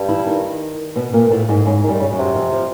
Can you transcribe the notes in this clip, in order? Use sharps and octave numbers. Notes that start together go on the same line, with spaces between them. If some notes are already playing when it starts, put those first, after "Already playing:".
Already playing: G2
E3 E4
D#3 D#4
B2 B3
A#2 A#3
A2 A3
G#2 G#3
G#2 C#3 G#3
D#3
G2 G3
C#3
F#2 F#3
C3
F2 F3
F3